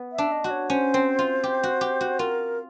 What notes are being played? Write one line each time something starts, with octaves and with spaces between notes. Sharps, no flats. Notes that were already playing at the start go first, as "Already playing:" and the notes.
Already playing: B3
E5
D4
D#5
F#4
C#5
C#4 C5
C4
F4
G4
F#4
G4
F#4
F4 A#4